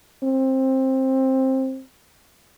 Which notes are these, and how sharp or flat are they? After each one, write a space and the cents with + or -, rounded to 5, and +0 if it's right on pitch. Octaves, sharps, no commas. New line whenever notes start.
C4 +15